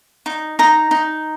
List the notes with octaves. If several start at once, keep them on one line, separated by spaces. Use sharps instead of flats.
D#4
D#4 A#5
D#4